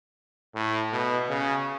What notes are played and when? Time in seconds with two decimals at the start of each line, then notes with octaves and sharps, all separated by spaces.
0.55 A2
0.92 B2
1.29 C#3